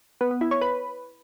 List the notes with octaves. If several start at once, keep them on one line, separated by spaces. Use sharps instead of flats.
B3
B3
E4
C#5
B4